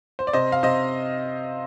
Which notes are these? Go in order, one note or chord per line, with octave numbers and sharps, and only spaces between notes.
C5
D5
C3 C5 D#5
F5
C3 C5 D#5